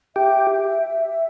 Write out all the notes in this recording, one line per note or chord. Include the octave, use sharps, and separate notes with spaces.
G4 E5